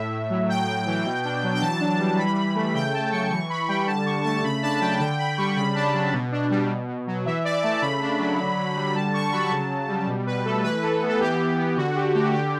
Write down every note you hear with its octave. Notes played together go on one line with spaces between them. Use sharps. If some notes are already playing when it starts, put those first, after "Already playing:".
Already playing: A2 E5
A2
F#3
A2 G5
A2
E3
B2
D4
F#3
G5
E3 A5
D4
G3
E3 B5
E3
A3
C#3 G5
C#3 A5
F#3 C#6
E3 C#6
E3 B5
G3 G5
D3 A5
D3 C#6
A3 A5
C#3 B5
D4 A5
F#3 G5
D3 G5
D3 B5
G3 C#6
C#3 B5
D4 A5
F#3
B2
D4
G3
B2
B2
F#3
E3 E5
E3 D5
A3 A5
C#3 B5
D4
F#3
D3
D3
G3
D3 A5
D3 C#6
F#3 B5
C#3 A5
C#3
G3
B2
B2 B4
A3 A4
E3 B4
E3 A4
B3
A4
E3 G4
E3
B3
D3 F#4
D3 G4
A3 G4
D3 G4